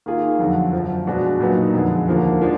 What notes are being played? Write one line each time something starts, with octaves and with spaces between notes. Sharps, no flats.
D#3 A#3 F4 G#4
F2 D3 F#3
F#2 D3 F3
B2 G#3 D4 F#4
A#2 F#3 B3 D#4
F2 D3 G#3
D#2 D3 F3 A#3
F3 G#3 D4